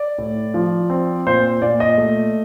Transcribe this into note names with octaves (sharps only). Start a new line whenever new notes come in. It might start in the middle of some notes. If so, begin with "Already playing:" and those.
Already playing: D5
A2
F3
C4
A#2 C5
A#2 D5
D#5
A3